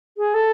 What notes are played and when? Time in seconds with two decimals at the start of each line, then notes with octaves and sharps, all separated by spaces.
0.17 G#4
0.34 A4